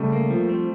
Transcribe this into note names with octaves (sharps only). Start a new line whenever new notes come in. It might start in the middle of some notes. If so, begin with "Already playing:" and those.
Already playing: C#3 G3 A3
A#3
F3
C4